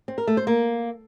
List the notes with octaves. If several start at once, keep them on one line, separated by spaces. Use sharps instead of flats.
C4
A#4
A3
C5
A#3